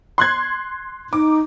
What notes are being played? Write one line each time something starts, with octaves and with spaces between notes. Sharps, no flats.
C6 F#6 G#6
D#4 D6